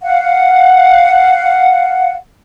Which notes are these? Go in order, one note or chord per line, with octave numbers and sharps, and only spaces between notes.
F5 F#5